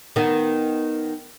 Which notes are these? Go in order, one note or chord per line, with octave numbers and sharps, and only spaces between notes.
D#3 B3